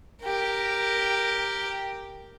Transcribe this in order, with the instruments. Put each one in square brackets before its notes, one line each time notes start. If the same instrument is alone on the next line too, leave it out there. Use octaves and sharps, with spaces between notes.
[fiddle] G4 A#4